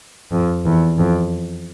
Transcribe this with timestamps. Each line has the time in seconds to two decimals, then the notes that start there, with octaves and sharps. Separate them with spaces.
0.32 F2
0.65 E2
0.98 F2